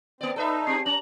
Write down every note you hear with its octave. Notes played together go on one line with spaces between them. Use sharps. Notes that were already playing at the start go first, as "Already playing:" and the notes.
A#3 C4 D5
D#4 A4 B4 E5
C4 G4 G#4 C7
C#4 A#5 F#7